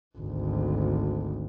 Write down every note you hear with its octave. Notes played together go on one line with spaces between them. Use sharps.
G#1 D2